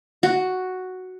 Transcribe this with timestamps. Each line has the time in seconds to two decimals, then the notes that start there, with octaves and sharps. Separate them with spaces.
0.23 F#4